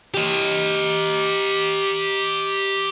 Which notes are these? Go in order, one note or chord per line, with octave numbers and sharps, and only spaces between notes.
G4 D#5